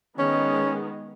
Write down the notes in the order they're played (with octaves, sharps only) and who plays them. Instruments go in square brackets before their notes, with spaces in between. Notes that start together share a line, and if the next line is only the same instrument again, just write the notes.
[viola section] D#3 G#3 B3 [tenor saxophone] C#4